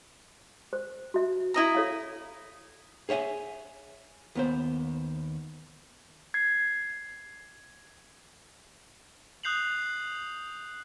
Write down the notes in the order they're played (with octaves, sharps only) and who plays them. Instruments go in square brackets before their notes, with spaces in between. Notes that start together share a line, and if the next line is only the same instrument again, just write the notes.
[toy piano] C5
F#4 E5
[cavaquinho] E4 D#5 A#5
[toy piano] A4 C#5 F5
[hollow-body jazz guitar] G#4 C#5 E5 F#5 G#5
D#2 B3 C5
[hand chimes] G#6 C7
[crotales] D#6 F#6 G6 C7 F7 F#7